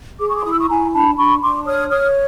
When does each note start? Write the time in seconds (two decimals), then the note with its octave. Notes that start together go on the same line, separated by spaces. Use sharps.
0.20 G#4 D6
0.28 C#6
0.36 C6 D6
0.44 E4 D#6
0.52 E6
0.59 C#6 D#6
0.69 E4 G#5 A#5
0.93 D4 A5 B5
1.17 D4 B5 C#6
1.42 D4 C6 D6
1.66 C#5 D#6 F6
1.90 C#5 D#6 F6